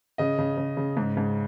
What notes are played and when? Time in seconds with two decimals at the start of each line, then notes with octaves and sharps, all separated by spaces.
0.18 C#3 D#5
0.38 C#3
0.57 C#3
0.77 C#3
0.97 G#2
1.17 G#2